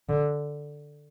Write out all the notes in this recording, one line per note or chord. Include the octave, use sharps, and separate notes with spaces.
D3